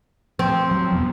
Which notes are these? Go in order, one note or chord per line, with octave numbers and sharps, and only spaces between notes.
F3 C4
F#3
E2 B2